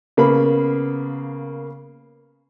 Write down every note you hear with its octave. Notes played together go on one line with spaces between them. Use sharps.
C#3 A#3 B3 B5